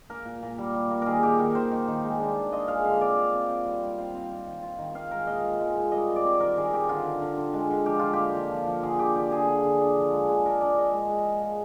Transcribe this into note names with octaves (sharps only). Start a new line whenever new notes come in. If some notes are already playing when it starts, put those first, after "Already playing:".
A#3 A#4
A#2
A#2
G3
G3
A#3
D#3 G#4 A#4
D#3 G4
D#3 A#4
D#3 C5
D#3
D#3
G#3
D4
F4
F4 D#5
G#3 F5
D3 F5
C4 D5
F4
C4
C4
G3
G3
C4 F5
C4
F4
D#3
F4
D#3
F4 F5
G#3 A#4
A#2 D#5
F4
G#3
A#2
G3 D#5
C4
D5
C4
D#3 A#4
D#3 G#4
C4 G4
D3 F4
D3
D3
D3
G#3
D3
F3 G4
F3 F4
A#3 G4
F3
F3
F3
D3 G#4
D3 G4
D3 G4
D3 G#4
D3 G#4
D3
D4
F3
G#3
D4 G#4
D4 A#4
D4 D5
G#3 D#5
G#3
G#3
F3
G#3